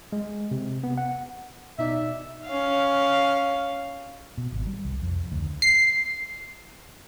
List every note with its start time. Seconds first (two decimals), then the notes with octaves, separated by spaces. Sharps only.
0.12 G#3
0.51 C3
0.84 B3
0.98 F#5
1.79 B2 D#4 D5 E5
2.47 C#4 F5
4.38 B2
4.52 G#1
4.67 G3
4.85 C2
5.02 F2
5.32 D2
5.62 C7